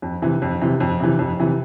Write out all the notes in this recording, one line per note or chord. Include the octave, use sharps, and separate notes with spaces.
F2
C3 E3
F2
C3 E3
F2
C3 E3
F2
C3 E3